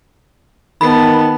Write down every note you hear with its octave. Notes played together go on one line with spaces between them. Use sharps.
D#3 B3 A5 B5